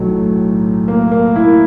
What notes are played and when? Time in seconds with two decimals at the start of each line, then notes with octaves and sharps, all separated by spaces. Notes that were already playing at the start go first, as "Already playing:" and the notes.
Already playing: B1 A2 F#3 A3
0.88 A#3
1.11 A#3
1.36 E4